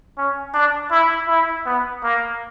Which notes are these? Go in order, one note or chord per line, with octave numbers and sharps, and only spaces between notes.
C#4
D4
E4
E4
B3
A#3